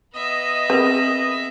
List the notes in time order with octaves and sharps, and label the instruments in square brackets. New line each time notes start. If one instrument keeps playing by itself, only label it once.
[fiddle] B3 E5 [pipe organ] D#5
[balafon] C4 G#4 A#4 [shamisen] B4